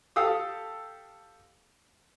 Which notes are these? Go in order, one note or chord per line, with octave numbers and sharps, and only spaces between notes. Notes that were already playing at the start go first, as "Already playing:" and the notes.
G4 A4 F5 D#6 E6